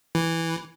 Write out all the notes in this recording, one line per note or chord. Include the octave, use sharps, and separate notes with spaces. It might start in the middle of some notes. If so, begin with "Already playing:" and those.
E3